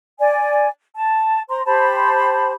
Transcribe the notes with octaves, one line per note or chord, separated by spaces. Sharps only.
D5 G#5
A5
C5 A#5 C6
G4 C5 A5 B5